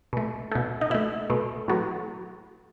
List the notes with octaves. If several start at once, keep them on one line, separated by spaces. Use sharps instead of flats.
B2 A3
B2 A3
D#4
B2 A3 E4
B2 A3
A2 F#3 B3